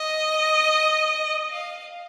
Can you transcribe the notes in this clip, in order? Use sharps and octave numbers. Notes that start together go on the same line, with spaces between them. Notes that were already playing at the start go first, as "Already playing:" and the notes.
Already playing: D#5
F5